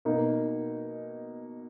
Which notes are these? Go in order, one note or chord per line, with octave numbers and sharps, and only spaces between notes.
B2 A#3 D#4